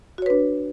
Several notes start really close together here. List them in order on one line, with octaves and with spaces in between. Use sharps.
F#4 C#5 B4 D4